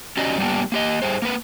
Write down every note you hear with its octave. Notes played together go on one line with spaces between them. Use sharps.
C#4 F#4 G4 D5 D#5
G3 A#3 B3 D4 G4
A#3 G4 D#5
A2 G3 A3 G#4 C5
A#3 A#4 B4